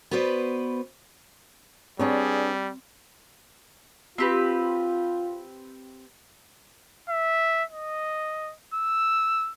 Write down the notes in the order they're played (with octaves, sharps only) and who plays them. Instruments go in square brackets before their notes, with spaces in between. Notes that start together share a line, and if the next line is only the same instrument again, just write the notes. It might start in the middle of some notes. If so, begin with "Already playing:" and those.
[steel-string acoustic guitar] B3 F#4 B4 C5 D5
[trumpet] G3 [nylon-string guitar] B3 D4 C#5 [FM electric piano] C4 [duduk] G#4
[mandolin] C4 G4 B4 [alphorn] F4
[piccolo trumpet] E5
D#5
E6